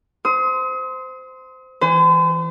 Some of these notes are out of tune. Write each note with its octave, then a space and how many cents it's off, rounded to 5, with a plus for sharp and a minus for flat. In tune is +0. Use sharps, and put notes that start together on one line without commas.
C5 -15 D#6 +40
E3 +0 C5 -45